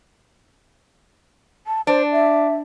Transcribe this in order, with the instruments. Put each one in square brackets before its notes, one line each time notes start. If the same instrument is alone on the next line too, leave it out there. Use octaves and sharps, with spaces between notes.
[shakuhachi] A5
[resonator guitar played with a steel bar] D4 [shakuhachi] C5
[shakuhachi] E5